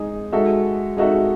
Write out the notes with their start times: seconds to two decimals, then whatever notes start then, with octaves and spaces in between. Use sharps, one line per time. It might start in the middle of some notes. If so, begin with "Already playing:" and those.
Already playing: G#3 D#4 G#4 D#5
0.32 G#3 D#4 F#4 A4 E5
0.97 G#3 D#4 F#4 A4 E5